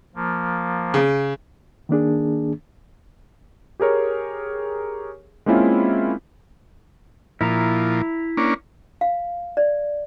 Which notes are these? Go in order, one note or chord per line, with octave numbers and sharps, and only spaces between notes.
F3 A#3
C#3
D#3 A#3 D4 G#4
G4 G#4 A#4 C#5
G#3 A#3 C4 C#4 E4 F4
A#2 F3 E4 A#5
A#3 C#4 D4
F5
D5